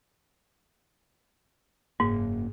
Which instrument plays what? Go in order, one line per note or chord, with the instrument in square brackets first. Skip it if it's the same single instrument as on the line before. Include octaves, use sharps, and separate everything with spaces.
[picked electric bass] F#1 A#3 [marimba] G#2